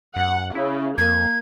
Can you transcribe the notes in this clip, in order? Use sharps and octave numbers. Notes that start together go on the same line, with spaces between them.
F#2 F#5
C#3 E4
F2 A#3 G#6